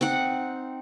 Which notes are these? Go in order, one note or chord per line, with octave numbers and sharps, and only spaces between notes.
C4 D#4 F#5